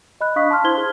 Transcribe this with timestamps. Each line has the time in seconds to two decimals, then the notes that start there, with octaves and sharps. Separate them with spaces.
0.21 D#5 B5 F#6
0.36 D4 F5 C#6 D#6 B6
0.50 A5 C6 F6
0.64 E4 C5 C6 G#6 G7
0.77 G#4